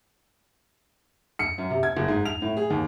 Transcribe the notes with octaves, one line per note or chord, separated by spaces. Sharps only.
C#7
F#2
C3
G#6
F#1
G#2
F7
A2
G#4
D#2